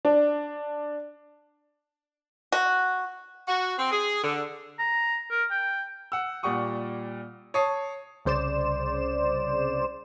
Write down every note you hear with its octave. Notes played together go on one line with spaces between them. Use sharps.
D4
F#4
F#4
C4
G#4
D3
A#5
A#4
G5
F#5 E6
A#2 G3 F#5 C#6 D#6
C#5 A5 D#6 C7
C2 C#3 C5 D5 E7